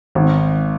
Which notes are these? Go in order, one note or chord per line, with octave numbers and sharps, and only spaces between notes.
G#1